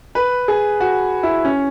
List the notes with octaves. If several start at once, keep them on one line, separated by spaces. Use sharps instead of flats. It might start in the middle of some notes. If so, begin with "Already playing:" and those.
B4
G#4
F#4
E4
C#4